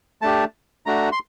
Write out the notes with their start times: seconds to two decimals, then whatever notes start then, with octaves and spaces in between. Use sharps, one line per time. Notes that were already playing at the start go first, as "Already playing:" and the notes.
0.22 A3 D4 G4 A5
0.86 A3 D4 F#4 A#5
1.12 C6